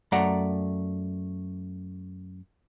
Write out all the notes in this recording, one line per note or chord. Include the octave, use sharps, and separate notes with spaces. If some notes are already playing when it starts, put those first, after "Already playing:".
F#2 A3 D5 F#5 A#5